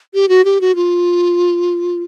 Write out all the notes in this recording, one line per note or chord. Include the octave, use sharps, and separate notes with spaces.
G4
F#4
G4
F#4
F4